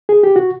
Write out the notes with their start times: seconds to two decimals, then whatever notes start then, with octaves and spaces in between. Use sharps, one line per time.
0.09 G#4
0.23 G4
0.36 F#4